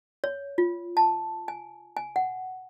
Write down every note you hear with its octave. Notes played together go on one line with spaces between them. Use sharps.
C#5
F4
A5
G#5
G#5
F#5